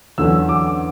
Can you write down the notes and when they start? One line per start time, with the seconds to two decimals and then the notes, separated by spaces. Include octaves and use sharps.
0.18 E2 D3 F#3 C#4 E6
0.49 D6